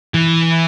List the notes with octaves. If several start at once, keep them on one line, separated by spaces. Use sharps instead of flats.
E3